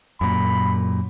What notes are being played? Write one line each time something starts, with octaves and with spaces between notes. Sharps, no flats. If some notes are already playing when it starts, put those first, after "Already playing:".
F#2 A#2 B5